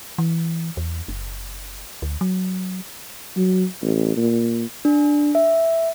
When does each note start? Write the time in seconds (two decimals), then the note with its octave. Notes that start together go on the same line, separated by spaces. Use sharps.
0.18 E3
0.77 E2
1.08 F#1
2.02 D2
2.21 F#3
3.36 F#3
3.82 A1
4.17 A#2
4.85 D4
5.35 E5